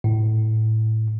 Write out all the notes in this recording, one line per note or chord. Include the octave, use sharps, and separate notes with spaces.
A2